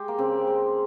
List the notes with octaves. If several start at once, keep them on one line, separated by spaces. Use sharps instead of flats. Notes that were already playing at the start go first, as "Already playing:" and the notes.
Already playing: G#3 G4
A#3
C#3 C4
G#3